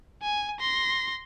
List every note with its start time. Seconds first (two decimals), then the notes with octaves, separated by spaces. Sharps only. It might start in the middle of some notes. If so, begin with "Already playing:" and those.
0.22 G#5
0.60 C6 A#6